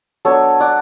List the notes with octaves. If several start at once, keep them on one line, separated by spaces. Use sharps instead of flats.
F#3 B3 D4 A4 C#5
D5 F#5